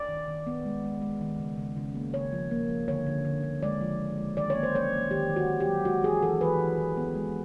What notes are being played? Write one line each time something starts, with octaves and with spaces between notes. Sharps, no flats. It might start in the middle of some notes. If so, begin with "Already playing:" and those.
Already playing: D5
D#3
D#3
B3
G#3
G#3
G#3
D#3
C#3
C#3
C#3
A#3
C#3 C#5
F3
A#3
F3
D3 C#5
D3
D3
D3
G#3 D5
F3
G#3
G#3
D#3 D5
C#5
A#3
C5
F#3 C#5
A#3
D#3 G4
D#3
F#4
D#3
G4
F#3
G#3 F#4
E3 G#4
E3 A4
E3 B4
E3
E3
B3
G#3